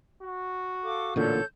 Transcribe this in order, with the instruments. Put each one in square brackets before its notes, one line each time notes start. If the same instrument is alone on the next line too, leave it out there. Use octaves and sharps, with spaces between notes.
[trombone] F#4
[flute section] A4 F5 D6
[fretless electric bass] A1 A#2 D3 [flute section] A4 C#5 G6